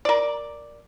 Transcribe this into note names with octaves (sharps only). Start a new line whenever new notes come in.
A#4 D5